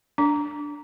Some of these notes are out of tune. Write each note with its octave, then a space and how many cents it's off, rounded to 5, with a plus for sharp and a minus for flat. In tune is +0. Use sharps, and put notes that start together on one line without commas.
D4 +0 D6 -35